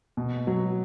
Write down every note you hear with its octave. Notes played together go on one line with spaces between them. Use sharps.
B2
F#3